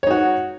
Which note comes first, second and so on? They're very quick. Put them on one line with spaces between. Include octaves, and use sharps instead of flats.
C#5 D#4 F#4